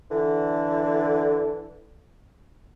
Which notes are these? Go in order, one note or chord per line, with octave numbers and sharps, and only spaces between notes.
D3 E3